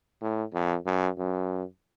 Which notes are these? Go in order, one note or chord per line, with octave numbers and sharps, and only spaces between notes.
A2
F2
F#2
F#2